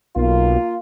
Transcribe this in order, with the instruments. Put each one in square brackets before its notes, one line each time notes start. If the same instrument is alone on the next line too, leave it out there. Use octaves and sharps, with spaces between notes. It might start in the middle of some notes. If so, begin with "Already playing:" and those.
[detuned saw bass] B1 [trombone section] A#3 F4